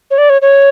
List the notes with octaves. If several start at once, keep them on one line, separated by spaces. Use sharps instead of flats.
C#5
D5
C#5
C#5